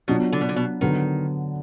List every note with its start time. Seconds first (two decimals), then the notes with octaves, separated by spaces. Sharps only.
0.08 B2 F#3 D4 F4
0.32 D3
0.41 B2
0.49 D3
0.56 B2
0.81 D3 D#3 F#3 B3